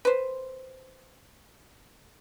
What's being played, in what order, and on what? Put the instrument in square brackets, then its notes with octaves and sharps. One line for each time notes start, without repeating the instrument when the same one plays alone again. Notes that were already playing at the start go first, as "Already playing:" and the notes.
[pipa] B4 C5